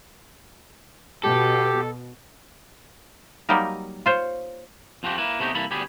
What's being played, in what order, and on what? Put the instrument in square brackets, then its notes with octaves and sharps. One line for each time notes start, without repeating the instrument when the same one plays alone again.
[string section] B2 [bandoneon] G4 [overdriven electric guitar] A4
[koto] F#3 G3 A#3 D#4 G4 A#4
F4 C5 C#5
[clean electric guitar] F2 F3 C4 F#4 G4
A#3 E4 B4
C3 A3 B3 D#4 G4
C2 E3 A#3 A4 B5
D2 G3 B3 G4 G#4 B5